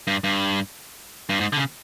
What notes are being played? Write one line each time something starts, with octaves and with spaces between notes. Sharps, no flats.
G2
G2
G2
G#2
D3
C#3